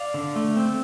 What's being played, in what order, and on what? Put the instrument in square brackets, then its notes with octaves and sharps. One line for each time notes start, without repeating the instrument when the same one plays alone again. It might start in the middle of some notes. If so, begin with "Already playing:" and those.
Already playing: [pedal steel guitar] D5 F5
D3
A3
C4